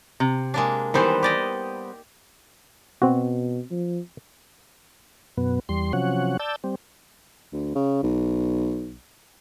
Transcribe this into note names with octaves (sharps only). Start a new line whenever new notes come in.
C3
G#3 A#3 D4
D#3 E3 G3 B3 C5
G4 D5 D#5
B2 C4 F#4
F3
F#2 B2 B3
E2 G3 C6
C3 F3 F#3 C#4 F#5
D5 A5 E6 G6
G3 C4
D2
C#3
B1